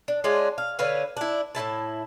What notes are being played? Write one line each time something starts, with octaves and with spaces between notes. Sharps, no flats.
D4
G#3 C#4 D4 F4
F5
D3 B4 C#5 F5
D4 E4
A2 C3 E4 A5